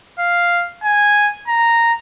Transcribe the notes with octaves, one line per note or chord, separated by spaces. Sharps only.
F5
G#5
A#5